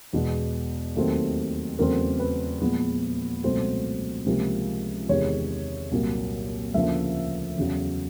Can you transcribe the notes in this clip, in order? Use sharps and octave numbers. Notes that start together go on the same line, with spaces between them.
E2 B2 G#3
D#2 D#3 F#3 A3 C4
E2 C#3 F#3 A3 C4 A#4
B4
A#2 F3 G#3 B3
C#2 B2 F#3 A3 C4 C5
C#2 C3 F3 A#3
E2 C3 D#3 G#3 C#5
C2 A#2 F#3 A#3
D2 C#3 F3 A#3 E5
E2 C#3 F#3